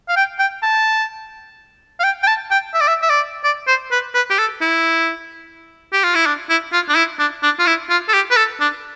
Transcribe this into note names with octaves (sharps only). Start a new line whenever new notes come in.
F5
G5
G5
A5
F5
G5
G5
A5
G5
E5
D5
E5
E5
D5
D5
C5
B4
B4
G4
A4
E4
G4
F4
E4
D4
E4
F4
D4
E4
D4
D4
F4
E4
F4
A4
G4
B4
A4
D4